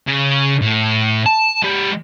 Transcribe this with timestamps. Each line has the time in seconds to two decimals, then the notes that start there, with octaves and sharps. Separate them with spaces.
0.07 C#3
0.62 A2
1.26 A5
1.62 G#3 G4